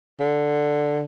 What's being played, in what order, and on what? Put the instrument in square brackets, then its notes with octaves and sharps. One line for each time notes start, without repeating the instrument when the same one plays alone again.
[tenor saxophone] D3